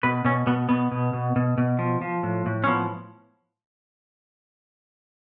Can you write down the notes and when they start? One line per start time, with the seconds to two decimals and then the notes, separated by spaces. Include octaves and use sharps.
0.03 B2 B4
0.25 B2 C#4
0.47 B2 B3
0.69 B2 B3
0.92 B2
1.13 B2
1.36 B2
1.58 B2
1.79 F3
2.01 F3
2.23 A2
2.46 A2
2.64 C#4
2.67 F3 B3